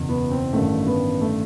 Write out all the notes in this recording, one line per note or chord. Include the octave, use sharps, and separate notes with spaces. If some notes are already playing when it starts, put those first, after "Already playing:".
Already playing: F#1 E2 B2
B3
C4
A1 G2 D#3 A3
B3
A3